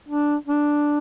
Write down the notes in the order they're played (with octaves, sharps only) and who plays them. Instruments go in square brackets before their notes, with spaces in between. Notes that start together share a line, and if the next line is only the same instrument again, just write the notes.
[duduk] D4
D4